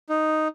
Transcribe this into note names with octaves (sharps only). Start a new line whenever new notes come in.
D#4